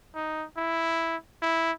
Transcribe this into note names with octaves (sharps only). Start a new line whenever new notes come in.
D#4
E4
E4